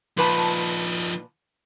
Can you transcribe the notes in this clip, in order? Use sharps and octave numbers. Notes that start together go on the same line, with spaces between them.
A#2 F3 D#4 B4 A5